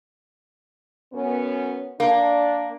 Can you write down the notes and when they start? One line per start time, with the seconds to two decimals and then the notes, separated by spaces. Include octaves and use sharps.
1.12 F#2 B3 C#4
2.00 A#3 D4